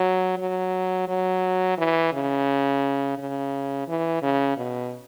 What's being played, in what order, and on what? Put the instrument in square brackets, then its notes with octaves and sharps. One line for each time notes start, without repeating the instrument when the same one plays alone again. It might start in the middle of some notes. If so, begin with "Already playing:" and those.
Already playing: [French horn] F#3
F#3
F#3
E3
C#3
C#3
E3
C#3
B2